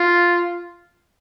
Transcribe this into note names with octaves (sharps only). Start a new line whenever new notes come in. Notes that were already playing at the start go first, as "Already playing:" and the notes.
Already playing: F4